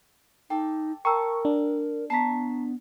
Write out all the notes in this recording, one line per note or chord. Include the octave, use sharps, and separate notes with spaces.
D#4 A4 G5 D6
A#4 G5 A5 A#5 C#6 E6
D4
B3 A5 A#5 C#6 B6 C7